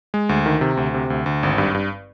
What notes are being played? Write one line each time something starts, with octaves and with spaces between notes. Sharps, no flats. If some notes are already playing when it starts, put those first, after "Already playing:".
G#3
D2
D#3
C3
D2
C3
D2
D2
G#1
G2
G2